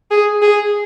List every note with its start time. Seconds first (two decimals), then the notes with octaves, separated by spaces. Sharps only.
0.11 G#4
0.42 G#4